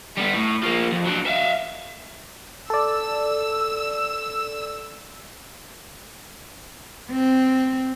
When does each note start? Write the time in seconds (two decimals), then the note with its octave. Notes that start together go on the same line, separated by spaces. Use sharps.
0.17 G3 B3
0.34 A2
0.63 F3 A#3
0.93 F2
1.06 F#3 D4
1.26 E5 F5
2.70 A4 D5 E6
7.11 C4